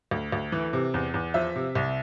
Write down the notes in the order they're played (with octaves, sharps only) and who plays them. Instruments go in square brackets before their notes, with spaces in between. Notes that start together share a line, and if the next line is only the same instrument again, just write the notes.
[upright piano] D2
D2
E3
C3
E2
E2
F3 E5
C3
C2